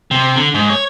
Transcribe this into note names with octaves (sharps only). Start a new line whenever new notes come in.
C3
D3
G#2
C#5